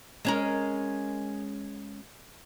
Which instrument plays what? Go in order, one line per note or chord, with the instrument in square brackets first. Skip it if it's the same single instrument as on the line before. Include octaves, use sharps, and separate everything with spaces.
[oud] G#3 C#4 A#4